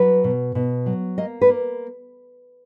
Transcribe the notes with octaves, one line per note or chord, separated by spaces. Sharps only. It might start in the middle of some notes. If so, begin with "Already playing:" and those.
Already playing: F#3 B4
B2
B2
F#3
A#3 D#5
B4
A#3